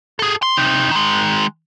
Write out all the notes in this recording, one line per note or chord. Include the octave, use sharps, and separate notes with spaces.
G#4 A4
C6
C3 D#4
D#3 G#3